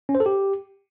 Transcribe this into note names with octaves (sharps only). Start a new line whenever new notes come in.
C#4
C5
A4
G4